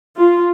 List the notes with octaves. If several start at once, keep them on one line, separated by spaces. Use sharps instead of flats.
F4